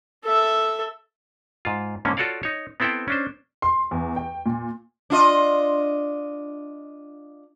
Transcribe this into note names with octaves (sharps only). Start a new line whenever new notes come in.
A4 E5
G#2 F4
G#2 D3 A#3 C#4
F4 F#4 A4 C#5 D5 F5
D#4 C#5
B3 C4 E4 A4 C5 G5
C#4 D4 C5
C6
E2
G5
A#2
D4 F4 D#5